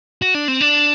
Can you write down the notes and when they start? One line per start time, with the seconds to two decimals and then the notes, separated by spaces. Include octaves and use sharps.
0.22 F#4
0.35 D4
0.48 C4
0.61 D4